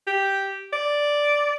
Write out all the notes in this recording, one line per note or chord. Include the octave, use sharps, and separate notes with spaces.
G4
D5